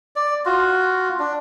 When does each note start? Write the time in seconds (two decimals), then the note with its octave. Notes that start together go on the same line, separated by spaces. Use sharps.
0.16 D5
0.45 F4 F#4
1.19 D4